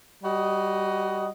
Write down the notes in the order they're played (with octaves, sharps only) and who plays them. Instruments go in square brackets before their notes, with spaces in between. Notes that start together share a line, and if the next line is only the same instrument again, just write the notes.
[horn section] G3 F#4 D#5